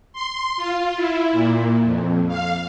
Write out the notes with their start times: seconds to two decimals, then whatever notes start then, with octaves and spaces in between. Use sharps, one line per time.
0.13 C6
0.57 F4
0.96 E4
1.33 A#2
1.84 F2
2.28 F5